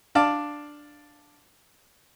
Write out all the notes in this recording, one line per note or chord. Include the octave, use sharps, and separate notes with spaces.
D4 D5 F5 A5